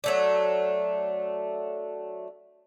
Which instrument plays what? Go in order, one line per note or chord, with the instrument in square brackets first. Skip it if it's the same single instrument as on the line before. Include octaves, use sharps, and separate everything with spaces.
[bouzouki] F#3 A3 D4